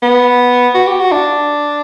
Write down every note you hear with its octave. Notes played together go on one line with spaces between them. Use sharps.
B3
F#4
G4
F#4
D4